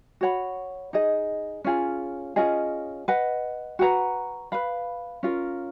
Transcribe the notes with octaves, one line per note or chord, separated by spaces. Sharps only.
F#4 C#5 F#5 B5
D#4 G#4 D#5
C#4 F4 G#4
C#4 F4 G#4 D#5
B4 D#5 F#5
F#4 B4 F#5 A#5
B4 F5 B5
C#4 F4 A#4